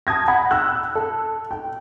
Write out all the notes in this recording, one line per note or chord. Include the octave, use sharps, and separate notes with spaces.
A5 D#6 G#6 A#6
F#5 B5
E6 F#6
A4
G5